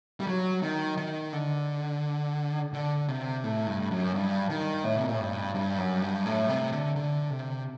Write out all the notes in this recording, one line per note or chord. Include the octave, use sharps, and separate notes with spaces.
G3
F#3
D#3
D#3
D3
D3
C3
A2
G2
F#2
G2
D#3
A2
C3
A#2
A2
G2
G2
F#2
G2
A2
C3
D3
D3
C3